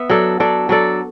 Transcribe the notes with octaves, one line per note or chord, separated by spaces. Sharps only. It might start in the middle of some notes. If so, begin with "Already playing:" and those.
Already playing: B3 E5
F#3 D4 A4 D5
F#3 D4 A4 D5
F#3 D4 A4 D5